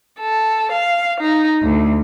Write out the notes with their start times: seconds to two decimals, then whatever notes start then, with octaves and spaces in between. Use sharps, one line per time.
0.20 A4
0.71 F5
1.20 D#4
1.62 D2